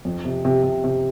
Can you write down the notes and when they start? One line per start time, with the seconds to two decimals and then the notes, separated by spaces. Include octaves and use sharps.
0.05 F2
0.25 C3
0.45 C3
0.63 C3
0.84 C3